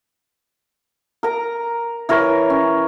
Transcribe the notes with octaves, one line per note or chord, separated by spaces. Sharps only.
A#4 A#5
E3 A#4 B4 C#5
C#4